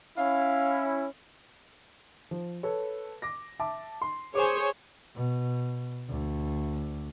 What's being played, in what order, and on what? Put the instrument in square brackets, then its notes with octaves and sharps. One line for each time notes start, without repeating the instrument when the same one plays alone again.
[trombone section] C#4 E4 [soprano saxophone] F5
[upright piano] F3
A4 B4 C#5
D6 A#6
E5 A5 D6
C6
[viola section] G#4 C5 C#5 [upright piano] G#5 D6
[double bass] B2
D2